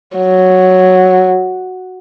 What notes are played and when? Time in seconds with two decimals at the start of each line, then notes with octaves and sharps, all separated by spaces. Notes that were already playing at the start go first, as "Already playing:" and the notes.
0.18 F#3